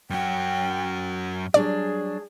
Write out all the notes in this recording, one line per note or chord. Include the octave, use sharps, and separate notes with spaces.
F#2 F#4 G5
F#3 G3 D4 G#4 D5